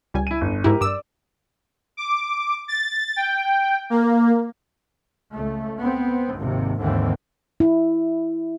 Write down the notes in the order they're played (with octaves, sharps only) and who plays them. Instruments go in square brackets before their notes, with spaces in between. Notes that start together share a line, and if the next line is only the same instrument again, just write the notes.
[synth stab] C#2 G3 G#5
[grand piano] E4 D#7
G1
[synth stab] G#2 E4 [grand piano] G4 A#4
[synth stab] G2 E6 [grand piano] D5 D6
[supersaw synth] D6
A6
G5
A#3
[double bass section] C#2 A3
B3 C4
G#1 D#2 C3
D#2 G#2 D3 E3 C4
[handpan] E4